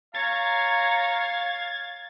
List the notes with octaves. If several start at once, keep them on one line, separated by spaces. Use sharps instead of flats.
C#5 F5 A#5 G#6 A6